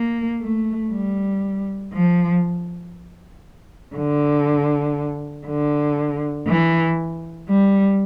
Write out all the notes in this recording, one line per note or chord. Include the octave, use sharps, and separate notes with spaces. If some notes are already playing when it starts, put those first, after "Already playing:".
Already playing: A#3
A3
G3
F3
D3
D3
E3
G3